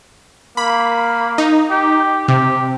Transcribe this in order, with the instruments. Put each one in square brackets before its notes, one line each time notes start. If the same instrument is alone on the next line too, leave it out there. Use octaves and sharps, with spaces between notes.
[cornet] A#3 [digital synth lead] B5
[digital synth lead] D#4
[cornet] G4
[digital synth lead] C3 [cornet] G4